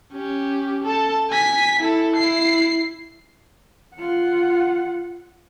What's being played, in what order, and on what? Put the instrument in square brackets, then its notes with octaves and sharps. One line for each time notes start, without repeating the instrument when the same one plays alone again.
[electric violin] C#4 G4
A4 A5
G#5 B6
E4 A4
E4 C7
[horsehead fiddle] F4 F#5